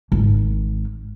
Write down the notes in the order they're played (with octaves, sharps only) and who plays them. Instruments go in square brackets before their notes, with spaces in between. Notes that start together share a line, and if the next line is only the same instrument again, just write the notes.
[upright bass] G#1